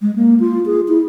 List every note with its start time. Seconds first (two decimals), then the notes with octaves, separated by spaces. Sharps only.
0.02 G#3
0.16 A#3
0.40 F4
0.66 G#4
0.88 E4